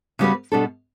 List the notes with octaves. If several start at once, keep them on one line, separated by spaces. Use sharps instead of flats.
C#3 G3 B3 F#4 B4
B2 G3 D4 A4